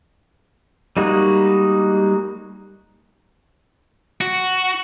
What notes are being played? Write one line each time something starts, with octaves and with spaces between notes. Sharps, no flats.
G3 G#3 A#3 D#4 F#4
F#4